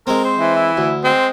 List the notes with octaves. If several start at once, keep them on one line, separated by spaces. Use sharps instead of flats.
G#3 C4 A#4
C5
E3
E4
D2
G#3 C4